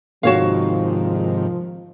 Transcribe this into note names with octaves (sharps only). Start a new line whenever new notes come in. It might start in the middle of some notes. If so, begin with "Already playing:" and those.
G#2 C3 D#3 F3 F#4 C#5 F5